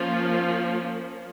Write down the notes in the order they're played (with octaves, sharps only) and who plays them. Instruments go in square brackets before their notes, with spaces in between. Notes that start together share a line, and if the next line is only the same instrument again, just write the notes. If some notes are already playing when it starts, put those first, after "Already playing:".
Already playing: [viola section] F3 A#3 C#4 F4